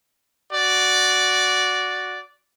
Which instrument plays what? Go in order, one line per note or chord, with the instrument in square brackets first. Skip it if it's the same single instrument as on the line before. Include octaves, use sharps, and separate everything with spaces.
[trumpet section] F#4 D5